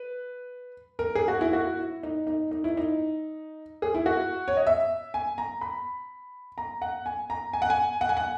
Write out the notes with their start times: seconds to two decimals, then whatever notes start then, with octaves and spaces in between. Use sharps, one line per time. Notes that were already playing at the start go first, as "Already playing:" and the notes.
Already playing: B4
0.99 A#4
1.15 G#4
1.28 F#4
1.41 E4
1.53 F#4
1.79 E4
2.03 D#4
2.27 D#4
2.51 D#4
2.64 E4
2.77 D#4
3.82 G#4
3.95 E4
4.06 F#4
4.48 C#5
4.57 D#5
4.67 E5
5.14 G#5
5.38 A#5
5.61 B5
6.58 A#5
6.82 F#5
7.06 G#5
7.30 A#5
7.53 G#5
7.62 F#5
7.70 G#5
8.01 F#5
8.09 G#5
8.17 F#5